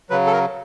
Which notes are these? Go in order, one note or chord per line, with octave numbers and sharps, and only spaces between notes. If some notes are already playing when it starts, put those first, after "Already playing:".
C#3 F#3 B4
A4
A#4